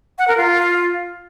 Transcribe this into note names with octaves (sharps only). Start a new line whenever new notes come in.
F#5
A#4
F4